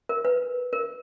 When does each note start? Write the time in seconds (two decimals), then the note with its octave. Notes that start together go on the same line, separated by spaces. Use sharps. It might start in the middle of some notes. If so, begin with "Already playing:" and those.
0.09 A#4
0.25 B4
0.73 A#4